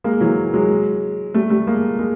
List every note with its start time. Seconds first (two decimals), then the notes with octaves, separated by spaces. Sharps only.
0.04 G#3 A#3
0.21 E3 F#3
0.53 F#3 G#3
1.34 G3 A3
1.50 G3 A3
1.67 G#3 A#3
1.99 G#3 A#3